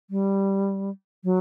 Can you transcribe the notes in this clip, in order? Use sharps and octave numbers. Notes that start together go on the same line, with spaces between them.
G3
F#3